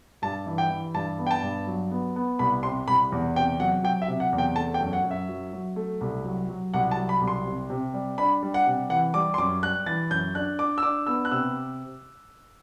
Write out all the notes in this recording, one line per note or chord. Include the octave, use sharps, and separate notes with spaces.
G2 A5
E3
G5
E3
G2 A5
B3
G5
A5
G2
F#3
B3
B3
C2 B5
C3 C6
C2 B5
E2
C3 G5
F#3 F#5
F#3 G5
E5
C3
F#5
E2
G5
A3 A5
G5
F#2
F#5
F#2
E5
F#3
F#3
A3
C2
F#3
F#3
C2 F#5
A5
F#3
B5
C2
C6
C3
C3
G3
D4 B5
G3
F#5
C3
E3 F#5
G3 D6
C6
F#2 D6
G3 F#6
E3 A6
F#2 G6
D4 F#6
D4 D6
E6
D4 D6
B3 E6
F#6
C3 E6